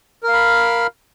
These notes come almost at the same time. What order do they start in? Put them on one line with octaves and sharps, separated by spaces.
A#4 F5 B5